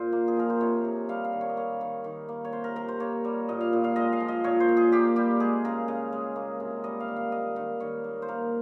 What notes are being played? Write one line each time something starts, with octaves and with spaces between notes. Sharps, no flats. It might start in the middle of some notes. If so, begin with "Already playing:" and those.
Already playing: A#2 C5
A#3
G#4
F3 A#4
C5
C3 C#5
C3
G3 F5
F5
D#3
C#5
D#5
A#3 C#5
D#3
D#3
A#3
C#5
C3 C5
A#4
C3 A#4
C5
A#3 C#5
G3
A#2 D#5
F5
A#2
F5
G#3 D#5
F5
F3
D#5
A#2 C#5
C5
A#2
G#4
A#3 G4
G3 G4
G#3 G#4
C#3 A#4
C#3 D#5
G#3
A#3
C3
G3 D#5
F5
D#3
F5
A#3 D#5
D#3
D#3 C#5
A#3
C5
A#3 A#4